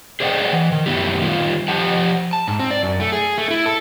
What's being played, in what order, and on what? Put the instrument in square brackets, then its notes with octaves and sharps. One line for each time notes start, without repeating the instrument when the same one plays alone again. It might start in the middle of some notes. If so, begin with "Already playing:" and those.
[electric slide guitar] G#4 C5 D5 D#5 F#5 G5
E3
D#3
F#2 A3 B3 E4 G4
D#3 G3 F4
F3 G4 F#5 A5
A5
G#2
C4
D5
F#2
A3
G#4
A3
E4
A4